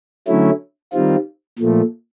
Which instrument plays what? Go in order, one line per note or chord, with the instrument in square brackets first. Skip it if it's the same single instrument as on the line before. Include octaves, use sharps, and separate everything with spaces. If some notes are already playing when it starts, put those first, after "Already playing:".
[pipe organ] D3 F#3 A3 C#4 E4
D#3 G3 C4 F4
A#2 F3 A3